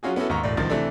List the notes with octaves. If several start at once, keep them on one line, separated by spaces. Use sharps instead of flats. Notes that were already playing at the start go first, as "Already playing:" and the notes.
F#3 C#4 F4 F#4 G#4
B3 C#4 E4 F#4 A4
D#2 G#2 A#5 C#6
E1 A2 D5
C#2 D#3 F3 A6
C3 E3 A3 D4 A4